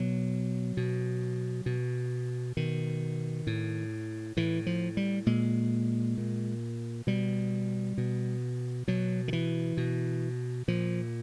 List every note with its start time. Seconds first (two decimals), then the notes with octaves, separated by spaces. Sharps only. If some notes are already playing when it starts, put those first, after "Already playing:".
Already playing: B2 F#3
0.77 B2
1.66 B2
2.57 B2 D#3
3.47 A2
4.37 A2 E3
4.66 F3
4.97 G3
5.26 A#2 G#3
6.17 A#2
7.07 B2 G3
7.98 B2
8.88 B2 F#3
9.28 D#3
9.33 E3
9.77 B2
10.68 A#2 F3